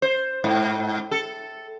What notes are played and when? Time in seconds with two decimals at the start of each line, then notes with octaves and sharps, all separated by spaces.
0.02 C5
0.44 G#2
1.11 A4